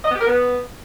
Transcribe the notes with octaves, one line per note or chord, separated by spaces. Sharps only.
D#5
B3
G4
A#4
B3